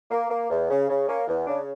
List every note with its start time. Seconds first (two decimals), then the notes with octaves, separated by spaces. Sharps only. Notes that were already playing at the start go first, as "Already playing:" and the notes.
0.11 A#3
0.30 A#3
0.50 E2
0.70 C#3
0.89 C#3
1.08 A#3 C#4
1.27 E2
1.47 C#3 D4